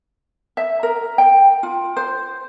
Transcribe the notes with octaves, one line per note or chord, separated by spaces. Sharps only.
E5
A#4
G5
F4
C5